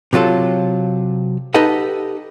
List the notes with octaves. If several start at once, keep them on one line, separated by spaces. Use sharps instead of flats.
C3 F#3 F4 A4
D#4 G4 A4 B4 D#5 F#5